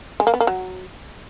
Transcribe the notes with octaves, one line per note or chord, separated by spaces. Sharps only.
G#3
A#3
B3
A#3
F#3